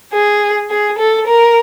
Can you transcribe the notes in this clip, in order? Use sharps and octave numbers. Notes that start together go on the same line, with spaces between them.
G#4
G#4
A4
A#4